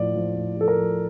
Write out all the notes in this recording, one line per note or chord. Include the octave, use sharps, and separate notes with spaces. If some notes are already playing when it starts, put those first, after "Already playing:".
Already playing: A2 F3 D5
F3
A2
F3 A4
A#4
F3